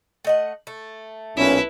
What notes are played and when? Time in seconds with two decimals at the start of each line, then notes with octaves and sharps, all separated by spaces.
0.25 A3 D#5 F#5
0.67 A3
1.37 B1 A#2 C#4 E4 B4